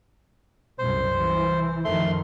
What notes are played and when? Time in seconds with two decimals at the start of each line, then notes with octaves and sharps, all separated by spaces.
0.79 C2 F#2 C5
1.15 E3
1.85 F#2 D#3 F3 A3 C6